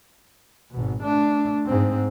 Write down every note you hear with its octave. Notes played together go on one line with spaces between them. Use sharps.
G#1 B2
A3 D4
G#2 C4